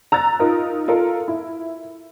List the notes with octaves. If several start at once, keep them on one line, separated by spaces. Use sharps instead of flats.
A#5 E6 F#6 A6
D#4 F4 A#4
F4 A4 A#4
E4